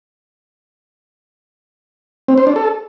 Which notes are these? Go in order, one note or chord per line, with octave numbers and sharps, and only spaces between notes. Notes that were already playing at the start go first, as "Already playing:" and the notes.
C4
C5
D4
A4